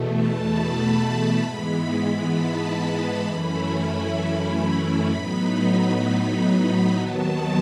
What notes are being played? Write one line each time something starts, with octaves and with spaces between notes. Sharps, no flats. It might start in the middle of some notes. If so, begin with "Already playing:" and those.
Already playing: E2 B2 A3
A5
B5
G#2 E3 G#3 B3
A5
A5
F#2 E3 A3 C#4 E4 B5
A2 F#3 B3 D#4 B5
D#2 D#3 F#3 B3 A5